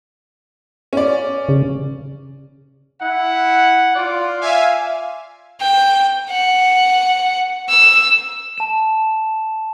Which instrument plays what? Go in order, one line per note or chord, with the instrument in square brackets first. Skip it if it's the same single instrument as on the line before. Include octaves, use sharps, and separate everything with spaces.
[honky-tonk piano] C#4 D5
[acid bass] C#3
[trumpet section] E4 F#5
F4 D5
[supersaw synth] E5 F5 G#5
[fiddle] G5
F#5
E6
[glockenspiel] A5 E7